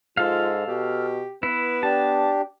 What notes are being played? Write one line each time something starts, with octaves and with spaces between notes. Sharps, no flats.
G#2 F4 A4 F5
B2 G4
B3 E4 B4
D4 G4 A5